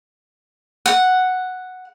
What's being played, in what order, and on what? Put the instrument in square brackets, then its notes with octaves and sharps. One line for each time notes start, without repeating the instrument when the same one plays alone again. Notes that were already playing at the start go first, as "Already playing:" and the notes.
[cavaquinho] F#5